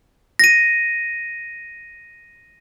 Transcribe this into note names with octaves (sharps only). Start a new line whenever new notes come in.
A#6 D#7